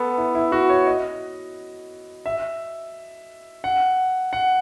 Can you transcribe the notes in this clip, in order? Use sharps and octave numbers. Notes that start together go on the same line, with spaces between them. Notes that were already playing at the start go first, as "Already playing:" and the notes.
Already playing: B3 A4
E4
E4
F#4
C#5
D#5
E5
F#5
F#5